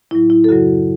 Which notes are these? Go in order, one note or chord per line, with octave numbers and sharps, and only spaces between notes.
A2 F#3 E4
E4
A4
F#2 C#3 F#3 F#4